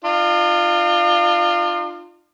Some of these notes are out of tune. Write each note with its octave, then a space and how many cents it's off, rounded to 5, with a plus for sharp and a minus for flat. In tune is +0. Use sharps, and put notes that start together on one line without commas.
D4 +45 F4 +0